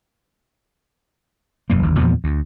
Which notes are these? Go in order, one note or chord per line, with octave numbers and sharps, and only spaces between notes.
E1 F#2 E3 A#3
G1 D#2
E2 A#2 F3 B3
D2